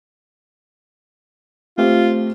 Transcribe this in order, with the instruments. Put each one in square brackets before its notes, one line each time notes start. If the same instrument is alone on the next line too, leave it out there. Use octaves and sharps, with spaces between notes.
[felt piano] A3 C4 G4 [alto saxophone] F4